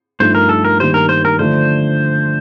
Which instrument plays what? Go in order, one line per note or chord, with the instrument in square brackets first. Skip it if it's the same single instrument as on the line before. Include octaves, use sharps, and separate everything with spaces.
[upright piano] G2 F3 A3 D#4 [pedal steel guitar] C5
[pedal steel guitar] A#4
A4
A#4
[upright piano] G2 D#3 A#3 D#4 G4 [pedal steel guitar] C5
[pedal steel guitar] A#4
C5
A#4
[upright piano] D3 F3 A3 D4 [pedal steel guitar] C5